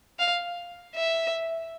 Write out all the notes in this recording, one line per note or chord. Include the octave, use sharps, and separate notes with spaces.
F5
E5